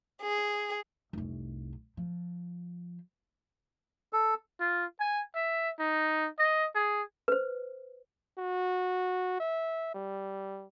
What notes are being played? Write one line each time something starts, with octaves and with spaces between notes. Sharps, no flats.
G#4
F1 C2
F3
A4
F4
G#5
E5
D#4
D#5
G#4
B4 C5
F#4
E5
G3